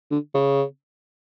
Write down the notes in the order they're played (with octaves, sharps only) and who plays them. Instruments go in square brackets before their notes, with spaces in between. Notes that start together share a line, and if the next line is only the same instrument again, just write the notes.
[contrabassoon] D3
C#3